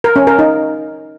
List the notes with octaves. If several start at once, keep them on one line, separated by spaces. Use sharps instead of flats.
A#4
C#4
A#4
D#4